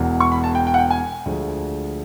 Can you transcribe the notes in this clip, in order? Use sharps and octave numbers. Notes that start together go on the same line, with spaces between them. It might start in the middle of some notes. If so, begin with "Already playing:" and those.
Already playing: E1 E2 B2
C#6
B5
A5
G5
G5
F#5
G5
G#5
D2 D3 F3 G#3